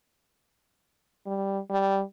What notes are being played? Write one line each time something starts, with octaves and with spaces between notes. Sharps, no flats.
G3
G3